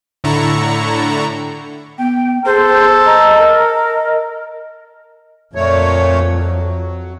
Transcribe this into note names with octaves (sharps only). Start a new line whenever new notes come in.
A2 D3 E4 A4 A#5 C#6
B3 G5
G#4 A4 C5
D#5 A#5
A#4
F2 A#2 A3 C#5
F#3